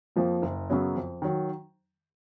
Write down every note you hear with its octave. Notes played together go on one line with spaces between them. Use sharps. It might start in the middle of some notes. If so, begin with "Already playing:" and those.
F2 F3 A#3
F#1
F#2 C#3 F#3 B3
F2
D#3 F#3